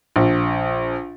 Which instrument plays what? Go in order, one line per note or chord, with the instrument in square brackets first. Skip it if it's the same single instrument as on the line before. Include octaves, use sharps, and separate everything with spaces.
[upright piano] A#1